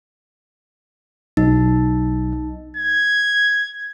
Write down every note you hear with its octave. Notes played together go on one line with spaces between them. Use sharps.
B1 D#4
G#6